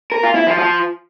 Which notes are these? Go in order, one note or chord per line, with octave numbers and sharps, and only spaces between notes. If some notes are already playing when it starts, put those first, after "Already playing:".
A#4
F4
E4
F3
F3